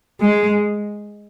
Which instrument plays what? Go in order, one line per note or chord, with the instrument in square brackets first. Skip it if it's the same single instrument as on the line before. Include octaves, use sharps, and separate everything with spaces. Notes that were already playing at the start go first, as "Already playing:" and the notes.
[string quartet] G#3